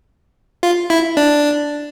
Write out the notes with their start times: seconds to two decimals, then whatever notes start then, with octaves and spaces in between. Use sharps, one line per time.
0.63 F4
0.90 E4
1.17 D4